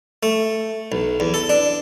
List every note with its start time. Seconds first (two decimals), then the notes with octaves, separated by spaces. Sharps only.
0.23 A3
0.92 B1
1.20 E2
1.34 A4
1.49 D4